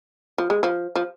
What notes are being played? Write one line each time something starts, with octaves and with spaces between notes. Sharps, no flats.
F3
G#3
F3
F3